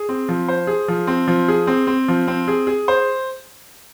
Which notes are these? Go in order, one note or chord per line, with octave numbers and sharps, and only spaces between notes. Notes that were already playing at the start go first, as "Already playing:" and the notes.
Already playing: G#4
C4
F3
C5
G#4
F3
C4
F3
G#4
C4
C4
F3
C4
G#4
G#4
C5